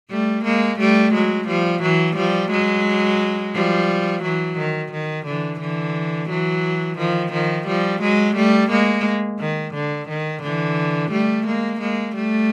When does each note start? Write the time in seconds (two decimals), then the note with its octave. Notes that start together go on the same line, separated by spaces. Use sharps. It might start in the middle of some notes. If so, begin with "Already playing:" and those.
0.10 G3 A3
0.44 G#3 A#3
0.79 G3 A3
1.14 F#3 G#3
1.47 F3 G3
1.82 E3 F#3
2.16 F3 G3
2.51 F#3 G#3
3.55 F3 G3
4.23 E3 F#3
4.57 D#3
4.92 D#3
5.27 D3 E3
5.61 D3 E3
6.30 E3 F#3
6.98 D#3 F3
7.33 D#3 F3
7.67 F3 G3
8.01 F#3 G#3
8.36 G3 A3
8.70 G#3 A#3
9.39 D#3
9.74 D3
10.09 D#3
10.43 D3 E3
11.11 G3 A3
11.46 G#3 A#3
11.80 G#3 A#3
12.15 G3 A3